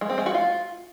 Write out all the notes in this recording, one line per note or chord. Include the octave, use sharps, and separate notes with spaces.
G#3
C4
G#3
F#4
F4